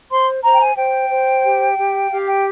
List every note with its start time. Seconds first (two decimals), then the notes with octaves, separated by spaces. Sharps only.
0.10 C5 C6
0.43 C5 A#5
0.52 G5
0.60 G#5
0.77 C5 G5
1.11 C5
1.44 G4
1.78 G4
2.11 G4 F5
2.27 G5